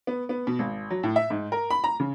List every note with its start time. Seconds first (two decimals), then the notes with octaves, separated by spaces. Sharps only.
0.07 B3
0.29 B3
0.47 B2
0.59 G#1
0.90 F#3
1.03 A2
1.16 E5
1.30 G#2
1.52 A#4
1.70 B5
1.84 A#5
2.00 C#3